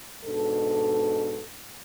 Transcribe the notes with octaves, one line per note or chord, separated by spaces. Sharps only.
G#2 B2 D4 A4